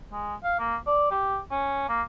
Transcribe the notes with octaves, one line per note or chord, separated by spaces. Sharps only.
G#3
F5
A#3
D5
G4
C#4
A#3